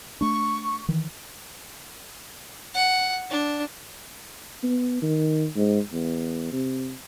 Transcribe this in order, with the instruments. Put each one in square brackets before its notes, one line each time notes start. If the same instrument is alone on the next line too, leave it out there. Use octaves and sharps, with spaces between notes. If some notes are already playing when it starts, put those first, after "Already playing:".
[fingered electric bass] A3 D4 [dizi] C#6
[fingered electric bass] D#3 E3
[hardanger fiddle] F#5
D4
[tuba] B3
D#3
G#2
E2
C3